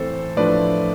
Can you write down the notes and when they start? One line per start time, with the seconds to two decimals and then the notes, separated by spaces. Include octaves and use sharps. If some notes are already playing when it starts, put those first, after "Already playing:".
Already playing: A2 E3 A3 C4 A4 C5
0.37 A2 F3 A3 D4 F4 B4 D5